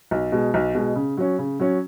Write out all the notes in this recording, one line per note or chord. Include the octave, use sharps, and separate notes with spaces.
B1
B2 G#3
B1
B2 G#3
C#3
F#3 C#4
C#3
F#3 C#4